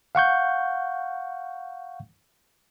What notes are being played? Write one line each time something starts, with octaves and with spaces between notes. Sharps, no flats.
F5 F#5 C#6 G6